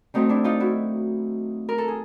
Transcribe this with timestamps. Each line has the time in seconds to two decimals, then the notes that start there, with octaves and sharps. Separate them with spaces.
0.14 D#3 F#3 A3 C4 D#4
0.29 D4 E4
0.44 D#4 F4
0.60 E4 F#4
1.69 A#4
1.78 A4
1.88 G#4